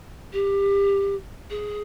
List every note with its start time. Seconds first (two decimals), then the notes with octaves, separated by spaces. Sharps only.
0.33 G4
1.50 G#4